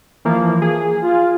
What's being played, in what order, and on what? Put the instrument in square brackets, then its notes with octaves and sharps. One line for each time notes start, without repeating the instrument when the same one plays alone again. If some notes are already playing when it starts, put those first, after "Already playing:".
[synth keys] E3 F3 A#3
G#4
[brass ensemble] F4